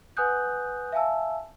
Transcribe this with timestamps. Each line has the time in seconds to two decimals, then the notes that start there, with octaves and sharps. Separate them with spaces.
0.17 B4 F#5 G#5 D#6 F#6 G6
0.92 E5 F5 G#5 A5 E6